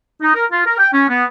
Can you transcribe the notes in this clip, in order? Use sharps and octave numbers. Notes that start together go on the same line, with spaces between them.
D#4
A#4
F4
A#4
G5
C#4
B3